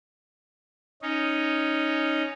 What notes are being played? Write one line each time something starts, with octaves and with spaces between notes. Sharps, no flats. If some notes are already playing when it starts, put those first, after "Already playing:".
C#4 D#4